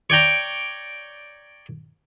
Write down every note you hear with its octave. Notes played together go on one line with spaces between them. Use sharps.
C#5 D5 G5 A#5